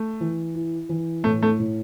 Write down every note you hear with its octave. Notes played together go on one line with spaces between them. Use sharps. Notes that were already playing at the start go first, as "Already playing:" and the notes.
Already playing: A3
E3
E4
E3
A2 A3
A3
A2